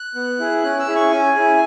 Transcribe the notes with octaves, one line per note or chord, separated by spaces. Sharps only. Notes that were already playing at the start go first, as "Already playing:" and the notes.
Already playing: F#6
B3
E4 G#4
C#4 F#6
E6
E4 G#4
C#6
C#4 G#5
E4 G#4